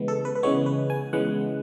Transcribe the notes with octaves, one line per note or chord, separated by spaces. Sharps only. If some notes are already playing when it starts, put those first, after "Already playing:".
Already playing: C#3 E3 G#3 B3
A4
B4
B4
C#3 E3 G#3 B3 C#5
B4
G#5
C#3 E3 G#3 B3 F#5